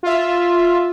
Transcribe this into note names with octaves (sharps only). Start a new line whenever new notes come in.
F4 E5